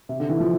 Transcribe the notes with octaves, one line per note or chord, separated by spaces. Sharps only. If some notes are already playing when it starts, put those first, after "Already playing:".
C3
D3
E3
F3